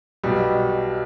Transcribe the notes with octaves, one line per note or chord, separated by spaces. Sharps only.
B1 B2 G3